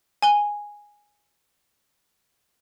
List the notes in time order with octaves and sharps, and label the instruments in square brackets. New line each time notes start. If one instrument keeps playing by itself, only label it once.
[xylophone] G#5 G7